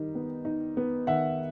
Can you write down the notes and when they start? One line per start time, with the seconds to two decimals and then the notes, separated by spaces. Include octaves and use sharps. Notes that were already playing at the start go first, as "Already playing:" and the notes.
Already playing: D#3 G3 D#4
0.15 B3
0.45 D#4
0.77 B3
1.07 D#3 E5 F#5